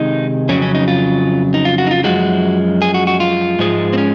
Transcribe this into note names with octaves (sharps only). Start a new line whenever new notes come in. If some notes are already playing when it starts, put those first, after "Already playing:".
Already playing: C3 D#3 G#3 D#4
F2 C#3 F#3 C#4
C#4
D#4
F4
D#4
F4
F#4
D#4
F4
F#2 F3 G#3 F#4
G#4
F#4
F#4
F4
G#2 F3 G#3
C4
C#4